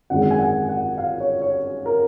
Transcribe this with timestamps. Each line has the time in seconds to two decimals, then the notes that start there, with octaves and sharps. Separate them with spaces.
0.10 G#1 F#2 D#3 G#3 F#5
0.30 G#5
0.39 F#5
0.69 F#5
0.98 F5
1.20 C#5
1.42 C#5
1.86 A#4